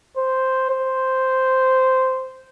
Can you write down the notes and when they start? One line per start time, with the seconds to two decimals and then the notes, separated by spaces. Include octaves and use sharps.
0.17 C5
0.70 C5